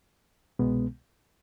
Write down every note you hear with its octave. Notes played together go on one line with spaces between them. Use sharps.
C2 B2 G#3 B3